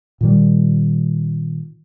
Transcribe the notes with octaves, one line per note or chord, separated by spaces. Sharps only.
A#2 D#3 G3